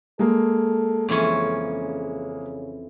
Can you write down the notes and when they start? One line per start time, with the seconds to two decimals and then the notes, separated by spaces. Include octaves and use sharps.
0.19 G#3 A#3 A4
1.09 F2 C#3 E3 C#4